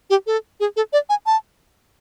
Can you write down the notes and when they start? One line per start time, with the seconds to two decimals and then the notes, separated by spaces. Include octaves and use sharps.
0.10 G4
0.27 A4
0.60 G#4
0.76 A4
0.93 D5
1.09 G#5
1.26 A5